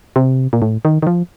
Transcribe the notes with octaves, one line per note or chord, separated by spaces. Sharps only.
C3
A#2
A2
D#3
D#3
F3